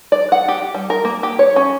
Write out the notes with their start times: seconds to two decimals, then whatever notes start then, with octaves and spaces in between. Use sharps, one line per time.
0.12 D5
0.32 F#5
0.48 G4
0.75 G3
0.90 A#4
1.05 A#3
1.23 G4
1.39 C#5
1.56 C#4